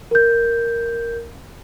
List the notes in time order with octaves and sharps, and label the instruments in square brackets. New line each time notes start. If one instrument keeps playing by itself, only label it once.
[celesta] A#4 G6